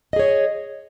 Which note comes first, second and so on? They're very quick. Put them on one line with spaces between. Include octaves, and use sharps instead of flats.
D#5 G#4 C#5